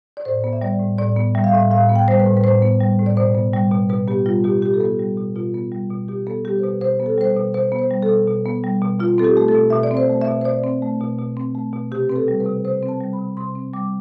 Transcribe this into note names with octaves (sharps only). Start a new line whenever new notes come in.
D5
A2 C5
B3
E5
G3 D5
A2
A2 D5
B3
G3 E5
F5
A2 E5
A2 F5
B3
G5
G3 C5
B4
A2
B4
A2 C5
B3
G3
A2
D5
B2 C5
B3
G3
B2
B2 B4
B3 G4
G3 F4
B2 G4
B2 G4
A4
B3 G4
G3
B2
B2 F4
B3
G3
B2
B2 G4
B3 A4
G3 G4
C5
B2 B4
B2 C5
B3
A4
G3 C5
B4
B2
B2 C5
B3
C5
G3
A4
B2
B2
B3
G3
B2
B2 F4
C4 A4
G4
A3
A4
B2
B2 E5
D5
C4
C5
A3
E5
B2
C5
B2 D5
C4
A3
B2
B2
C4
A3
B2
C3 G4
C4 B4
A4
G3
B4
C3
C3 C5
C4
A5
G3
B5
C3
C3 C6
C4
G3 D6